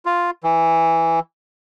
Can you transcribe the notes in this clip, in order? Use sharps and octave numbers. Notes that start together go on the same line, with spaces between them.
F4
E3